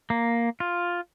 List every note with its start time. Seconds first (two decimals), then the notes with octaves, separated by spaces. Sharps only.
0.10 A#3
0.60 F4